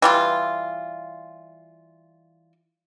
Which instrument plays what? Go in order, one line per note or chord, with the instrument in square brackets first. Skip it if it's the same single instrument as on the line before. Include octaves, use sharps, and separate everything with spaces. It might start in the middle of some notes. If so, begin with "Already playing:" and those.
[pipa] E3 G3 F4